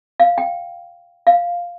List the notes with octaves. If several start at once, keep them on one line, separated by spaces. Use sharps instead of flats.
F5
G5
F5